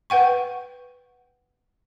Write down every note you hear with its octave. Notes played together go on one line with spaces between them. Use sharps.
B4 F#5 G5 C#6